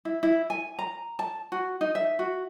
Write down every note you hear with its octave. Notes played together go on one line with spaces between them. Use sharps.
E4
E4
G#5
A#5
A5
F#4
D#4
E5
F#4